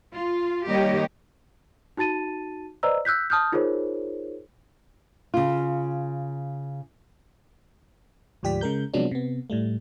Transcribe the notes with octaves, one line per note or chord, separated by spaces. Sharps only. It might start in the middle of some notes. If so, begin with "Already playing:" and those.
F4
D#3 G3 A#3 G4 C#5 D#5
D#4 F#4 A5 A6 D#7
B4 C5 D5 D#5 A#5 E6
E6 F#6 G6 B6
A5 D#6 F6 G6
D#4 F4 G#4 A#4 C5 C#5
C#3 F4
D2 G#2 F3 G4 D5 B6
C#3 G#3 A#4 G6
C3 F3 F#3 G#3 B3 D4
C3 B3
A2 G3 A3